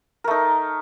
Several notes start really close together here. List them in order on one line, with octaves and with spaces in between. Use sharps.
A#4 A3 D#4